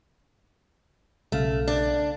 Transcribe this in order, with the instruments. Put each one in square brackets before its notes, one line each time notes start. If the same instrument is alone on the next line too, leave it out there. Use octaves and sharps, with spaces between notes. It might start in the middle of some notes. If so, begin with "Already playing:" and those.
[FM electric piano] B1 C#3 F5 [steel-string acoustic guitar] A3
[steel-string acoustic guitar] D4